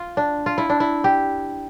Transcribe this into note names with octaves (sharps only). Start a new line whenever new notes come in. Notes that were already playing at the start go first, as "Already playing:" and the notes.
Already playing: F4
D4
F4
E4
D4
E4
G4